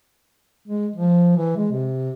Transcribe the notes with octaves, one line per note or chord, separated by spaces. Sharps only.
G#3
F3
E3
G#3
C3